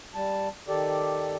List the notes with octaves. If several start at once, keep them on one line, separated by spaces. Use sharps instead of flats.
G3 A5
D#3 G4 A4 D5